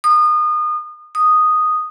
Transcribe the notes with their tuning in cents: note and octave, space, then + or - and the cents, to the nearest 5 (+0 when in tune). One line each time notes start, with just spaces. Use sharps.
D#6 -30
D#6 -5